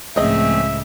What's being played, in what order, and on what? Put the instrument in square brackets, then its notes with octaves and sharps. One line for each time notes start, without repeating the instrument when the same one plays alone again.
[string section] C#2 A2 [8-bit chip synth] F3 A3 C4 [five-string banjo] G#4 D#5 [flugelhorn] E5